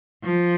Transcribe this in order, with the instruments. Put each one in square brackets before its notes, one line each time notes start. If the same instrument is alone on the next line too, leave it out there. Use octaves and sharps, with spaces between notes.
[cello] F3